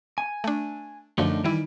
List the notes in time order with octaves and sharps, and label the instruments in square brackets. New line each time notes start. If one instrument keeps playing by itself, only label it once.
[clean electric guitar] G#5
[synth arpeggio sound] A3 D4
[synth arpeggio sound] F#2 D3 F3 [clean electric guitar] A3 D4 D#4
[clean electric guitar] D#3 [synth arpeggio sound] E3 G3 E4